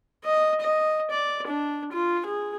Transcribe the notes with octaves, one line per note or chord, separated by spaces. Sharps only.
D#5
D#5
D5
D4
F4
G#4